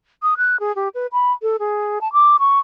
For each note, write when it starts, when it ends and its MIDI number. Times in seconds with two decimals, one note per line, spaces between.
0.23 0.34 87
0.38 0.59 90
0.60 0.74 68
0.76 0.89 67
0.95 1.07 71
1.13 1.32 83
1.42 1.57 69
1.59 1.99 68
2.01 2.11 81
2.13 2.37 86
2.39 2.59 85